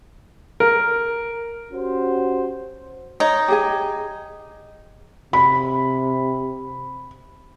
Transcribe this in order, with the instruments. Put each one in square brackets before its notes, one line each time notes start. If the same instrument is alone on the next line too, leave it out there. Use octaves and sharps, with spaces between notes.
[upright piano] A#4
[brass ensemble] C#4 F#4 G4 C5
[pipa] D#4 [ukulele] C#5
[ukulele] G4 G#4 G#5
[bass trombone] C3 [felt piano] B5